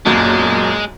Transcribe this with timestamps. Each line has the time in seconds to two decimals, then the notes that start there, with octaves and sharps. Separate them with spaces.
0.06 B1 F#2 A#2 G#3